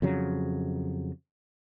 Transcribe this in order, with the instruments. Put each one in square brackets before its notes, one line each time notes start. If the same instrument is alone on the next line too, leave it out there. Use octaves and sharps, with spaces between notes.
[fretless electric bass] F2 C#3 F#3